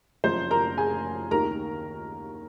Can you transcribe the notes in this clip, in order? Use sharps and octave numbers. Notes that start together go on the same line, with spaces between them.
F#1 F#2 F3 C5 C6
A#4 A#5
G#4 G#5
D#2 D#3 A#4 A#5